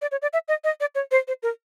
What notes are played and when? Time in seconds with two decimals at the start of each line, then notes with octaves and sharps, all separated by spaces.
0.02 D5
0.12 C#5
0.22 D5
0.33 E5
0.48 D#5
0.64 D#5
0.81 D5
0.95 C#5
1.11 C5
1.28 C5
1.43 A#4